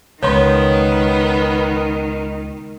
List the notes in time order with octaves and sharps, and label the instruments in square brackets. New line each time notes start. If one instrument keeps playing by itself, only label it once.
[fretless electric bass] C#2 [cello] D#3 [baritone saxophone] B3 [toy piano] C#5 C6